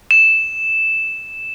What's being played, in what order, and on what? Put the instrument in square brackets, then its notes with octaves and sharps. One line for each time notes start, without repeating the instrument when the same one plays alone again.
[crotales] E7